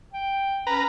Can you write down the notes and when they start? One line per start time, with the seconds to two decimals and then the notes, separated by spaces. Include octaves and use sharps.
0.13 G5
0.67 C#4 B4 A#5